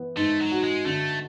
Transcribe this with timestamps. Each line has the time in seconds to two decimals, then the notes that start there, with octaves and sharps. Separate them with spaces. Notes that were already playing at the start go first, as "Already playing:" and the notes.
Already playing: E3 B3
0.17 G#2 A3
0.40 F#3
0.52 F#4
0.63 G#3
0.86 D3 A3